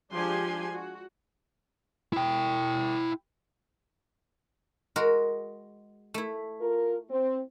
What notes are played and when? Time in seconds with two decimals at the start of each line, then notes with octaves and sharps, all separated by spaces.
0.13 F3 G#3 D4 G4 G#5 C6
0.72 F#4
2.13 E4 G5
4.96 G#3 F#4 A#4
6.14 A3 E4
6.61 F4 A#4
7.09 C4